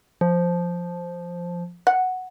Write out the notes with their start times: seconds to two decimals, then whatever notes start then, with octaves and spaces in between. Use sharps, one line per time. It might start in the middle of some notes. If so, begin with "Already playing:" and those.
0.21 F3
1.87 F#5